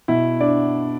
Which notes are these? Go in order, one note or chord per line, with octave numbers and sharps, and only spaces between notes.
B2 E4 E5
D4 D5